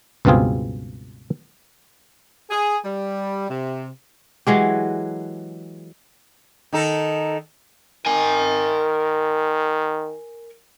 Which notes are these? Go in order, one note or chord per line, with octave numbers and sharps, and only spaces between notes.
C#2 G2 B2 C4 F4 G#4
G#4
G3
C3
E3 F#3 G#3 G4
D#3 D#4 A4
D#3 A#4 G#5